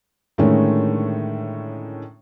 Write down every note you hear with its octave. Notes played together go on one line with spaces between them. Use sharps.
A2 D3 D#3 G#3 A3 C#4